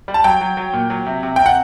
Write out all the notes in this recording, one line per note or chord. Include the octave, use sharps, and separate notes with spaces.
G3
A5
F#3 G5
F#3
F#3
A#2
F#3
C3
C3
C3 G5
F#5